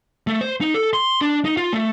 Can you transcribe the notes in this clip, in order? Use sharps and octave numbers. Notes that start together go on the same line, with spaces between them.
A3
C5
D#4
A4
C6
D4
D#4
F4
A3